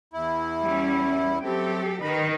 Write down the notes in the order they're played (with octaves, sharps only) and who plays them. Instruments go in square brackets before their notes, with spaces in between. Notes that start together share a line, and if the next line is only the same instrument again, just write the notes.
[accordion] E2 E4
[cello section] G3 C#4
[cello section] F#3 G4 A4 [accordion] A3 C4
[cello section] D#3 D#4 B4 [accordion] B5